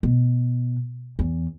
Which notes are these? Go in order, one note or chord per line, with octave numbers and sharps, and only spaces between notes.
B2
E2